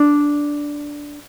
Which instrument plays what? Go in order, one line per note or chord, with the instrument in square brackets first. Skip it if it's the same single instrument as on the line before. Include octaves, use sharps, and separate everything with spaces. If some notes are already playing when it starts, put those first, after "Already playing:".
Already playing: [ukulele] D4